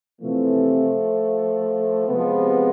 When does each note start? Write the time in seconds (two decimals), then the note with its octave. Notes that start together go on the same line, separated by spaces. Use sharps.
0.21 C3 E3 F3 A3
2.09 C3 F3 G#3 B3